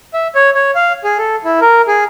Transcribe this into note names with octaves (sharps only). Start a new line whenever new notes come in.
E5
C#5
C#5
F5
G#4
A4
E4
A#4
G#4